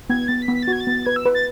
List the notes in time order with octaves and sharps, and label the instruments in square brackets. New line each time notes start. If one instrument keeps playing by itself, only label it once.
[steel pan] B3 [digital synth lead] G#6
[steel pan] B3 [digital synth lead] A6
[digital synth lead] B6
[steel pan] B3
[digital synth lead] B6
A6
[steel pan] F#4 [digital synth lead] G#6
[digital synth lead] A6
[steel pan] B3
[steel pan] B4 [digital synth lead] G#6
[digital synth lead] E6
[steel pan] B4
[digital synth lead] A6